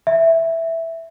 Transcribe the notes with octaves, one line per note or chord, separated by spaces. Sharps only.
E5